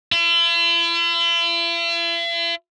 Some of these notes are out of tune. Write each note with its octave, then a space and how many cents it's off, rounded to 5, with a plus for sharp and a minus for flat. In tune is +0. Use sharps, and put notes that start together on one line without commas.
E4 +45